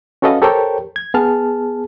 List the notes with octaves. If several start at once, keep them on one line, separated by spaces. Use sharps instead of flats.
C#4 F#4 A4 B4 D#5 F5
G4 A4 A#4 C5 C#5 G5
G#6
B3 G#4 A5 F6